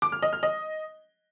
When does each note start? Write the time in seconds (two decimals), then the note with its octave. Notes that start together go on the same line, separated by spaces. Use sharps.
0.02 D6
0.12 F6
0.22 D#5
0.33 F6
0.43 D#5